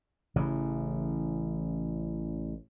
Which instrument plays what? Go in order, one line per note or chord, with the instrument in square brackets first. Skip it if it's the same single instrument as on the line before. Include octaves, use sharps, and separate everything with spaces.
[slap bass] A1 C#3 E3